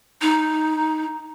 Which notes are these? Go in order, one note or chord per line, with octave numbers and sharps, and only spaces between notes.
D#4